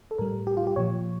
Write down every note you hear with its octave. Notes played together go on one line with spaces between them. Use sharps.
A4
A2 G3 A#4
G4
F4
G4
A#2 F3 C#5